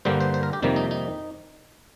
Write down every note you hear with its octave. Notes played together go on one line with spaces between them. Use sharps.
G2 D3 G3 A#3 C5
C5
C5
A#4
G4
F2 C3 D#3 G3 A#3
D#4
D#4